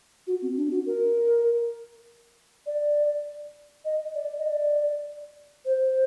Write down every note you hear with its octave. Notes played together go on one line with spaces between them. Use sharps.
F#4
C4
D4
F#4
A#4
D5
D#5
D5
D#5
D5
C5